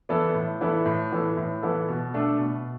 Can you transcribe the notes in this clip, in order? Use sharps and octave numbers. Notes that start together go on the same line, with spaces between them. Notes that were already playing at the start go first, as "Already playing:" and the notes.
E3 B3 E4 A4
A2
E3 B3 E4 A4
A2
E3 B3 E4 A4
A2
E3 B3 E4 A4
B2
A3 D4 A4
B2